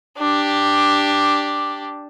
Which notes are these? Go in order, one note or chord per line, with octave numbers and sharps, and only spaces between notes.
D4 G4